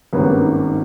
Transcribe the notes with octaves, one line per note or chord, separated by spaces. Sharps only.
G#1 G2 D#3 A#3 B3 C#4
D#4
D#4